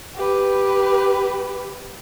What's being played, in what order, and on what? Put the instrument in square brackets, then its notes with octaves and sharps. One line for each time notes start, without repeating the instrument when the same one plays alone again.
[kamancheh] G4 B4